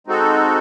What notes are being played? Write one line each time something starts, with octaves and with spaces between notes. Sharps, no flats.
G#3 C4 D#4 F#4 A4